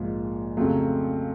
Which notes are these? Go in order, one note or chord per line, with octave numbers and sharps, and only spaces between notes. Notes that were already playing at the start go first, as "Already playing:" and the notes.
Already playing: A#1 G#2 F3
F2 C#3 F#3 A3